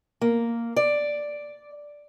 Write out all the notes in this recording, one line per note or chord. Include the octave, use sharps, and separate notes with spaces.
A#3
D5